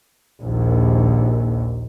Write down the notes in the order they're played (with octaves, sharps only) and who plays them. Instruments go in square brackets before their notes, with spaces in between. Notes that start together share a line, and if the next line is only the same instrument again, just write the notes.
[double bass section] A#1 D#2